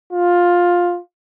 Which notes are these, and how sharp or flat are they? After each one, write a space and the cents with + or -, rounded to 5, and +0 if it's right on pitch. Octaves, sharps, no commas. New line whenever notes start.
F4 +10